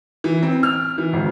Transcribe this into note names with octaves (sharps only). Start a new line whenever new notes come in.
E3
C4
F6
E3
G#1